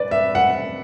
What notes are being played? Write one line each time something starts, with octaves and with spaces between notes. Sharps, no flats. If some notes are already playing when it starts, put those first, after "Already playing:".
Already playing: B4 D5
E5
F#5